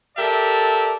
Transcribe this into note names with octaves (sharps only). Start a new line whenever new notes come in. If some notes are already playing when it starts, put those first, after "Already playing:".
G4 A4 A#4 D5 E5